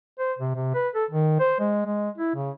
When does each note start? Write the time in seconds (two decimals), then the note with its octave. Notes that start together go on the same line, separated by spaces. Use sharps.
0.19 C5
0.39 C3
0.55 C3
0.74 B4
0.95 A4
1.11 D#3
1.39 C5
1.59 G#3
1.86 G#3
2.18 E4
2.35 C#3